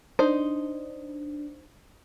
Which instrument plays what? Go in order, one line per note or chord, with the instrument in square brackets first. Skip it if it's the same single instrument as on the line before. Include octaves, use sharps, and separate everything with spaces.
[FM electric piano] D4 [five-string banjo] D#4 C5